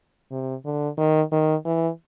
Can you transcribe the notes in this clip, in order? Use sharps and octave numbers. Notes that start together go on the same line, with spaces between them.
C3
D3
D#3
D#3
E3